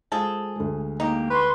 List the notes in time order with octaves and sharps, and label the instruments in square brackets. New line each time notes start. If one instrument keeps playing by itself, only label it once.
[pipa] F3 G#4 A4 [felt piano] G#3
[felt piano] D2 G#3
[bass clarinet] A#3 [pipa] D#4 G4
[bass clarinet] B4 [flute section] C6 C#6